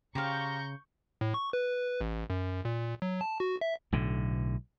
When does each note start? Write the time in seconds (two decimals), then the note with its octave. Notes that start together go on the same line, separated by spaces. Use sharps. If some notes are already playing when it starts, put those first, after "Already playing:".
0.15 C#3 G4 C5 F5 A#5 C#6 G6
1.21 A2
1.34 C#6
1.53 B4
2.01 A1
2.30 F#2
2.65 A#2
3.02 F#3
3.21 A5
3.40 F#4
3.61 E5
3.92 B1 A2 D3